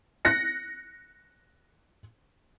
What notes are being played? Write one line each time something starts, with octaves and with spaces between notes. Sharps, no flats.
F#6 A#6 C#7